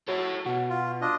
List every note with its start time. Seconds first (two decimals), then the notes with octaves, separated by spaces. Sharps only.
0.08 F#3 A4 C#5
0.46 B2 F#4
0.70 F4
1.01 D4 F4 D#5